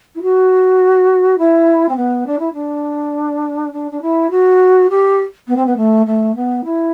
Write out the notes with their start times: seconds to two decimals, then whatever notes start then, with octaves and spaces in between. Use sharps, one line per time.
0.15 E4
0.22 F#4
1.38 E4
1.88 C4
1.96 B3
2.26 D4
2.39 E4
2.53 D4
3.73 D4
3.91 D4
4.01 E4
4.30 F#4
4.90 G4
5.47 B3
5.56 C4
5.66 B3
5.76 A3
6.06 A3
6.35 B3
6.64 E4